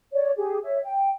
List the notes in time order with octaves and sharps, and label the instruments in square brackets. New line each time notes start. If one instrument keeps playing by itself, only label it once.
[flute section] C#5 D5
G4 G#4
C#5 E5
G5